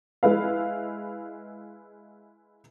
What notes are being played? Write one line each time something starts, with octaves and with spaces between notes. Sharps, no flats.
G#3 E4 B4 F5